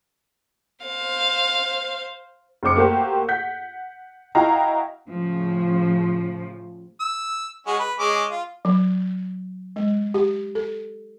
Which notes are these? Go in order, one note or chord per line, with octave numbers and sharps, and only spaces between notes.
C5 F5
F#1 C#3 C5 D6 C#7
A3 A#3 F#4 G4 C5
F#5 G6 B6
E4 F#4 D#5 F5 G5 A#5
A2 C#3 F3
E6
G#3 C#4 F#4
B4
G#3 C#4 D6
F4
F#3
G#3
G4
A4